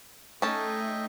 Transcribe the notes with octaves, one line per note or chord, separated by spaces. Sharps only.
A3 C#4 D#4 D#5 E5 G5 A5